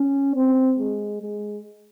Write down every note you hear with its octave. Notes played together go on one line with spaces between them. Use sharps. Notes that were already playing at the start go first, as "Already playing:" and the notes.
Already playing: C#4
C4
G#3
G#3